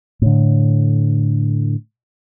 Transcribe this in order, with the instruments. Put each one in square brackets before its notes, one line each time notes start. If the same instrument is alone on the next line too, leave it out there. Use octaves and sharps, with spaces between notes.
[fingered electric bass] A2 D3